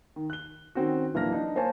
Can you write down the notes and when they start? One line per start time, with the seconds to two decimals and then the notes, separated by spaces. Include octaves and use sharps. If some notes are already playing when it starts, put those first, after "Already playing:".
0.16 D#3
0.30 F#6 G7
0.75 D#3 C4 C#4 F#4
1.14 D1 E3 A#3 D4 F6 A#6
1.32 D4 D#4
1.55 A#3 C5 C#5 G#5 A5